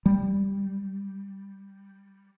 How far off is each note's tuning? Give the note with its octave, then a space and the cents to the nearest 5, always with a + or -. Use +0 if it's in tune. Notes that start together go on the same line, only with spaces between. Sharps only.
G3 +0